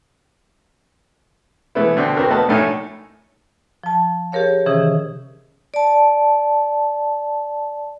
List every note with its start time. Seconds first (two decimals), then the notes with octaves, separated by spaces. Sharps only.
1.75 E3 G#3 A3 B3 E4
1.97 B2 D3 C4 D4
2.17 B3 C4 D4 F#4 A#4
2.30 A3 B3 D#5 F#5 A5
2.48 A#1 A2 A3 D#4 C#5 G#5
3.83 F3 A5
4.32 G4 G#4 A#4 C#5 F5
4.66 C3 D#3 E3 C#4 G#4 D#6
5.74 D5 A5